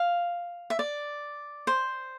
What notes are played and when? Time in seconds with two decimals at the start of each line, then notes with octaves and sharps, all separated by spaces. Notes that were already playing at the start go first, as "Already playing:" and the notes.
Already playing: F5
0.70 E5
0.79 D5
1.67 C5